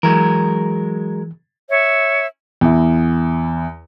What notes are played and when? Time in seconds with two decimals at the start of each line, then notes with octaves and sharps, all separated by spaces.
0.03 E3 F#3 G#3 A#4
1.70 C#5 E5
2.61 E2 E4